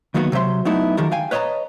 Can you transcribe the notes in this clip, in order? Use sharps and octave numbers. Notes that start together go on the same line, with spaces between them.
D2 D#3 F#3 A#3 B3 F#4
C3 F#3 C5 E5 C6
F#3 A3 B3 D#4 E4
D#3 F3 F#3 G4 A4 A#4
F5 G5 G#5
B4 C#5 D#5 F5 A5 A#5